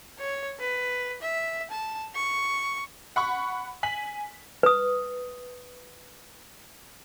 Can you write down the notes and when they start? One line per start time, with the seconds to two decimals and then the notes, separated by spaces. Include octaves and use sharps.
0.19 C#5
0.60 B4
1.22 E5
1.71 A5
2.15 C#6
3.16 F#5 B5 C#6
3.83 G#5 B6 F#7
4.63 B4 D#6